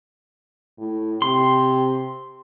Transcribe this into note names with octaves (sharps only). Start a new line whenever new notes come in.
A2
C3 C6